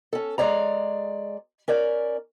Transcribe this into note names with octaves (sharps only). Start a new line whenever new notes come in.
C#4 A4
G#3 G#4 C#5 D5 A#5
C#4 A#4 D5